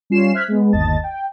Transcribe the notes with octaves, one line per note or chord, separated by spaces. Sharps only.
G3 C#4 F4 C7 E7
C5 E5 F6 F#6 G#6 B6
G#3 B3
G1 D#2 D#5 A5 A6
G5